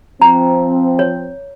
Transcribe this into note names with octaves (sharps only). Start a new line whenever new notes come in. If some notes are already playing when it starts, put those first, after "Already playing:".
F3 C4 A#5
C#5